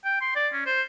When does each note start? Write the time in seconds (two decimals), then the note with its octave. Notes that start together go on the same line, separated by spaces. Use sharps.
0.05 G5
0.21 C6
0.36 D5
0.53 C#4
0.66 C5